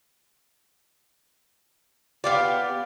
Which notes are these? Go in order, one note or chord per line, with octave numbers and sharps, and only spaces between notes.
B3 F4 G4 D5 F5